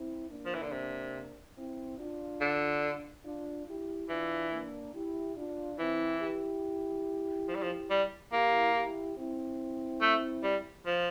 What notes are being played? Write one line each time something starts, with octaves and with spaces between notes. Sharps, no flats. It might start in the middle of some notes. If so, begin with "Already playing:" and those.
Already playing: C4 E4
A#3 D4
F3
E3
D3
C3
C4 E4
D4 F4
D3
D4 F4
E4 G4
E3 D4 F4
A#3 D4
E4 G4
D4 F4
E3 C4 E4
E4 G4
F3
G3
F3
G3
A#3 E4 G4
E4 G4
C4 E4
A3
G3
F3